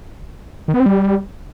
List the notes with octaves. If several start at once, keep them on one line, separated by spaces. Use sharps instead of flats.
D#3
B3
C4
G3